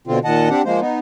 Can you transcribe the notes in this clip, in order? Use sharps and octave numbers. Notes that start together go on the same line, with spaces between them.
B2 D3 C4 F4
A#2 D#3 D#5 F#5 A5
C4 D4 G4 F#5
F3 G#3 A#3 C5
B3 D#4